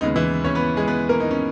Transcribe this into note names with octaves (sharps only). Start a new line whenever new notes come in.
D#2 C#3 G#3 B3 D#4
E3 E4
C#4 C#5
B3 B4
G#3 G#4
B3 B4
A#3 A#4
D#4
C#4